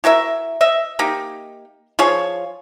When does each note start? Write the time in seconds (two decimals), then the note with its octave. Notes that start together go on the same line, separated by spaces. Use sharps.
0.04 E4 F#4 A#4 E5
0.61 D#5 E5
0.99 A#3 D#4 G4
1.99 F3 F4 G#4 C#5